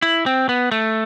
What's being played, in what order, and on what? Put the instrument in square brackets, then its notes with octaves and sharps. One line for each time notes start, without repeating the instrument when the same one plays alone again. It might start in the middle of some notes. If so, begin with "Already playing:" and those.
[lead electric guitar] E4
C4
B3
A3